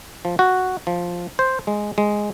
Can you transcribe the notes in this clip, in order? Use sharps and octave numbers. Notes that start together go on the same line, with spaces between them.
F3
F#4
F3
C5
G#3
G#3